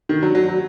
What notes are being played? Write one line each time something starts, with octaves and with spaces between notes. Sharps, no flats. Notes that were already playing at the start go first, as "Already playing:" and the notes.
D#3
F#3
F#3
F#3